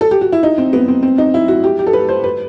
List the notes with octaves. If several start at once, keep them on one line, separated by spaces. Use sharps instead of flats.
A4
G4
F#4
E4
D#4
C4
B3
C4
C4
D#4
E4
F#4
G4
G4
A4
B4
C5
B4